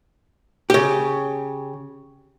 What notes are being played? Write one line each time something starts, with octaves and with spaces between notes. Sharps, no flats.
C#3 G4